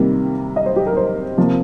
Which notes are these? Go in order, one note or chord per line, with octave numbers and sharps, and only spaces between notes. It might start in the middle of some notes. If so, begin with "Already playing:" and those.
Already playing: C3 D#3 G3 A#3
D#5
C5
G4
A#4
C5
C3 F3 A#3